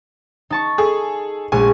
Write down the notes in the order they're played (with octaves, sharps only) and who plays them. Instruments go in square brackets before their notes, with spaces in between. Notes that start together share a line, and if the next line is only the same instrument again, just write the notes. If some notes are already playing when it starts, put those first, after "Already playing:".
[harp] D#4 A5 C#6
[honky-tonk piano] G#4 A4
[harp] A#1 G#3 C#6 [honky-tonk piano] G#5